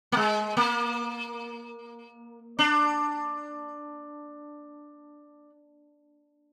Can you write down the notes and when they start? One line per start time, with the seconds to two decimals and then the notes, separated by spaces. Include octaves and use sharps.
0.12 A#3
0.17 G#3
0.57 A#3
2.59 D4